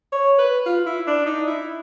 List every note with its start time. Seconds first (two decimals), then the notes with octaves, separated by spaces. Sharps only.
0.12 C#5
0.39 B4
0.66 F4
0.86 E4
1.07 D4
1.26 D#4
1.47 E4